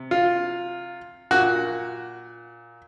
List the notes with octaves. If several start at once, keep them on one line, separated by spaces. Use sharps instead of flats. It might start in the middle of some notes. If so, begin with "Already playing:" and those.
Already playing: C3
F4
A#2 F#4